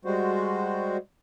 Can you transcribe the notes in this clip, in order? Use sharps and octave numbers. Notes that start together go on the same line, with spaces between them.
G3 G#3 F#4 C5